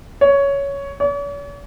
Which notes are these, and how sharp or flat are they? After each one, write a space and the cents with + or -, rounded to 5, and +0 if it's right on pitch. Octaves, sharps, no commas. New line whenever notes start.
C#5 +10
C#5 +45